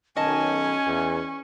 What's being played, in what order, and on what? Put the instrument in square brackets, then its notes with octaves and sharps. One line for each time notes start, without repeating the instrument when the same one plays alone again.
[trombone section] B1 D#3 [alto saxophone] C#4 [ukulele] D#5 A5 [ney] G#5
[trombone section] E2